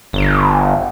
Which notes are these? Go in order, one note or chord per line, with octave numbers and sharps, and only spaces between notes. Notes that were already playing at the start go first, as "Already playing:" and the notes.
G1